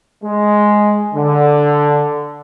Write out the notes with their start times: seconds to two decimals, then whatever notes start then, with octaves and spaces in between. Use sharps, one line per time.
0.24 G#3
1.14 D3